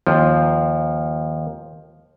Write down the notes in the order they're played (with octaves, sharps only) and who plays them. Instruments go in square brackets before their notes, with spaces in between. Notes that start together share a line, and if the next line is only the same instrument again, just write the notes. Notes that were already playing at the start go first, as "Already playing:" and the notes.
[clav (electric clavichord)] D#2 F3